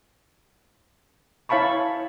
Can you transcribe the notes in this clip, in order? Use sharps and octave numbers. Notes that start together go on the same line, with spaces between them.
E4 C#5 F5 A5 B5 C#6